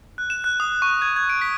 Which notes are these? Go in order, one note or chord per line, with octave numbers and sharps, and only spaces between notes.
F#6
E7
F#6
D#6
C#6
G#6
G#6
D7
B6